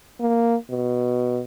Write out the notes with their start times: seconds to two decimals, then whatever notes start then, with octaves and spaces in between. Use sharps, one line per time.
0.20 A#3
0.70 B2